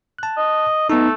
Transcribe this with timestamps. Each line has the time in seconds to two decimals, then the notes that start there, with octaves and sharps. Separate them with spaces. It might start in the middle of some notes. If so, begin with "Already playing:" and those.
0.19 A5 F#6
0.37 D#5
0.90 A3 B3 D#4